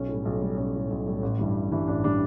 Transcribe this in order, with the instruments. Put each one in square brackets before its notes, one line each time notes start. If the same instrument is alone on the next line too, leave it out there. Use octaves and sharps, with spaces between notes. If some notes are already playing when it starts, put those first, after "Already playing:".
Already playing: [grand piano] B1 C#4
A2 G3
B1
A2 G3
B1 C#4
A2 G3
B1
A2 G3
A1
G2 E3 G3
A1
G2 E3 G3
A1 D4
E3 G3 D4